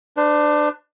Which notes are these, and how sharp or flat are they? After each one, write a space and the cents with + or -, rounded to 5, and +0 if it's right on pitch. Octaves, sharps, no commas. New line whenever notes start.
D4 +15 C5 -45